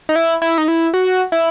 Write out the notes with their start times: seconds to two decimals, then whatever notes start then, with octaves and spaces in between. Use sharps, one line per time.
0.09 D#4
0.16 E4
0.42 E4
0.58 D#4
0.68 E4
0.94 F#4
1.32 E4